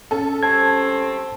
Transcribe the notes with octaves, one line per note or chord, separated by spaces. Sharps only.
C#4 A4
G3 A3 C4 A5 G#6